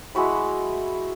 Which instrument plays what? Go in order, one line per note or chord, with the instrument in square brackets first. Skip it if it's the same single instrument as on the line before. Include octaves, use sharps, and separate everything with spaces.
[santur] G#3 E4 F#4 B5